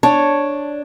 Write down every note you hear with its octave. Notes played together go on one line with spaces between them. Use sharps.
D4 C#5 A5